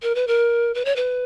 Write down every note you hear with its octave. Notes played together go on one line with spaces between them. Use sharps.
A#4
B4
A#4
B4
C#5
B4